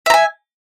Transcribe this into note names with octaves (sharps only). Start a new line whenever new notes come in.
E5 G#5 A#5